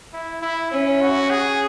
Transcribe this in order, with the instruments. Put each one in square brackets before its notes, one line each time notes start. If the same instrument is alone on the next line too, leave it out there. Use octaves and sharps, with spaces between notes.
[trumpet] E4
E4
[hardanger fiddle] C#4 [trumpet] E4
[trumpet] F#4
G#4